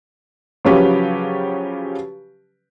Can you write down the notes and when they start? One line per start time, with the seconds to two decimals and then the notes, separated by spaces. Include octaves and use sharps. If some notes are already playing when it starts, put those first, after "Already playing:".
0.65 C#3 F3 F#3 C#4 G4 B4